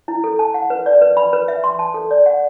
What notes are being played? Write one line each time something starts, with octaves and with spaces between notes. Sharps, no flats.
E4
A4
A5
F#5
B4
D5
B4
B5
B4
E5
C6
A5
A4
D5
F#5